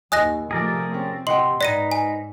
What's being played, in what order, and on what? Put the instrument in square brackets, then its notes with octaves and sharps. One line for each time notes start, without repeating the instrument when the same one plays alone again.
[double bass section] D#2 [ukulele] D#5 G#5 [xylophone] D#6 F#6 A#6
[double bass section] C3 F3 A3 [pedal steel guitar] G#4 A#4 D5
[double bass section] C4 [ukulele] C#4
[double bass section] C3 [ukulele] D#5 F#5 G5 [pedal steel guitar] C6 [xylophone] F#7
[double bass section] G#2 [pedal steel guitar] D#4 B4 [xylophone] D5 A#6 D#7
[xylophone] G#5